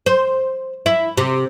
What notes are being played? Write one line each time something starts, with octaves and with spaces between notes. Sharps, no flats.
C5
E4
C3